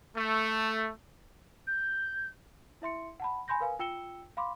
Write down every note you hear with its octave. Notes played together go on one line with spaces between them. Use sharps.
A3
G6
E4 E5 C6 C#7
F#5 A5 B5
G#5 B5 C6 G6 A#6
A#4 B4 F5 G#5
F4 G5 E6 C#7 E7 G7
F5 B5 C6 D6